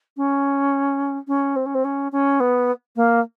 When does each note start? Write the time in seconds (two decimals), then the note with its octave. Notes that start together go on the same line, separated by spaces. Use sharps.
0.17 C#4
1.27 C#4
1.56 C4
1.66 C#4
1.74 C4
1.84 C#4
2.12 C#4
2.40 B3
2.96 A#3